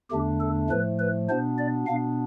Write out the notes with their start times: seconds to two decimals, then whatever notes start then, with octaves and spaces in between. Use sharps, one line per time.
0.11 E2 D3 A3 D4 G4
0.40 A4
0.70 A2 F3 A3 B4
0.99 B4
1.29 B2 B3 D4 C5
1.58 D5
1.87 B2 B3 D4 F5